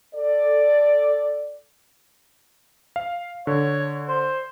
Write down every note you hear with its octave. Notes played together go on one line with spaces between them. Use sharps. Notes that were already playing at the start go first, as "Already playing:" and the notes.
A4 D5
F5
D3 C#5
C5